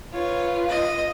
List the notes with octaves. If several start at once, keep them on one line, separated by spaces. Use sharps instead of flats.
F4 B4 C#5
D#5